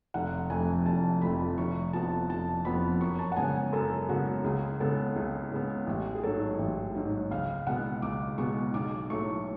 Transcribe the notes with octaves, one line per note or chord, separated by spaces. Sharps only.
F1 F#5
F2 F3 A3 G#5
F1 A5
F2 F3 A3 B5
F1 C#6
F2 F3 B3 A5
F1 A5
F2 F3 B3 B5
F#2 C#6
A5
F#5
C#3 G#3 B3 G#5
G#5
F#2 A4
C#3 G#3 B3 F#4
C#2 G#4
C#3 G#3 B3 A4
C#2 G#4
C#3 G#3 B3
A1
G#4
G#2 F#3 A4
A1
G#2 F#3
C#2 F5
B2 G#3 B3 F#5
C#2 D6
B2 G#3 B3 C#6
B1 D6
A2 F#3 A3 C#6